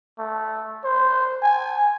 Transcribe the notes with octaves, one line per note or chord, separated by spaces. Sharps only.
A3
C5
G#5